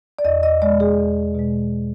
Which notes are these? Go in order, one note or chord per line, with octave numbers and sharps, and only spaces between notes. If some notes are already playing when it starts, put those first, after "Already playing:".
D5
E2 D#5
D#5
B2 G#3 D5
G#4
E2
B2 G#3